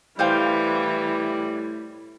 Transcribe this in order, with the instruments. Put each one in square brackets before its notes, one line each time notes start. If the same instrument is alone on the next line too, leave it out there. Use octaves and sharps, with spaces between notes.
[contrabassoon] A2 [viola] E3 [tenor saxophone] G3 [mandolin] C5 F5 G5